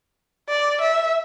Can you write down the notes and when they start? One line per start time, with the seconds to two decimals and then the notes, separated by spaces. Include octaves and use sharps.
0.49 D5
0.81 E5